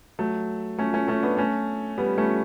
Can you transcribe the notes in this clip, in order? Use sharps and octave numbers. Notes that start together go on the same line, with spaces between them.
F#3 A3
A3 C#4
A3 C#4
A3 C#4
B3 D4
A3 C#4
G3 B3
A3 C#4